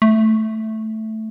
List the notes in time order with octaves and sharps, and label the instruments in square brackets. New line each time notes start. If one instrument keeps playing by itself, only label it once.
[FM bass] A3